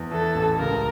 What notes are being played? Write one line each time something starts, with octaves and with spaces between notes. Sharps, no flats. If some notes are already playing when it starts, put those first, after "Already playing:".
Already playing: E2
E3 A4
A1
C#2 A#4